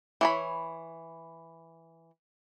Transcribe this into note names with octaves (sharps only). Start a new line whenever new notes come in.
E3 C#5 B5